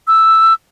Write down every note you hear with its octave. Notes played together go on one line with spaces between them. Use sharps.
E6